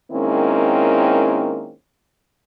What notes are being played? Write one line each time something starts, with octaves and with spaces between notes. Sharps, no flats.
D#3 G#3 A#3 C4 C#4 E4